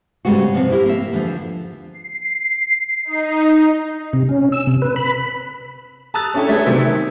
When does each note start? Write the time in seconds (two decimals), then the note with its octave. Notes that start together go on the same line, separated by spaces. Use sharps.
0.25 G#2 C#3 G3 G#3 B3 F#4
0.54 C3 F3 B3 C4
0.71 E4 G4 G#4 A#4
0.86 A#3 E5
1.13 E2 D3 D#3 F3
1.93 C7
3.05 D#4
4.13 C3
4.29 C#4
4.52 E6
4.67 C3
4.82 B4
4.96 B5
6.14 A5 A#5 D#6 E6 F#6 A6
6.34 C#4 D4 E4 G4 A4 C#5
6.49 A3 G#4 B4
6.66 C3 D#3 F#3 A3 B3 C4
6.85 D#3